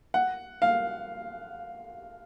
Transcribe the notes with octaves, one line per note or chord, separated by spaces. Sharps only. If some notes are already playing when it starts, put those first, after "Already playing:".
F#5
F5